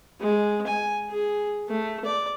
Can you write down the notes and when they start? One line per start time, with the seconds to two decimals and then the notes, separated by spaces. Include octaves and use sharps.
0.21 G#3
0.67 G#5
1.10 G#4
1.68 A3
2.05 D5